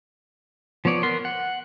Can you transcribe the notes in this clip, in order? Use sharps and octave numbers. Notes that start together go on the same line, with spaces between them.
F3 B3 C#5 D5
B3 A#4 C6
F#5